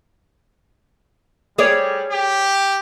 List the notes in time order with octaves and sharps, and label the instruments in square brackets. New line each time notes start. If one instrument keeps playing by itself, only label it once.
[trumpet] G3 [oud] G#4 C#5 D5
[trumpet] G4